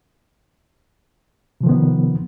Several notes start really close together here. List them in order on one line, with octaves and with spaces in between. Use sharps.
C3 F3 D#3 B3